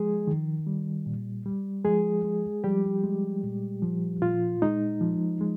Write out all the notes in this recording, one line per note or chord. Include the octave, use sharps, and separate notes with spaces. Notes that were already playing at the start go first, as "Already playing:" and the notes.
Already playing: F3 G#3 G#4
D#3
G3
A#2
G3
F3 G#3 G#4
G#3
F3 G3 G4
G#3
A#2
F3
A#2 F4
G#3 D#4
F3
G#3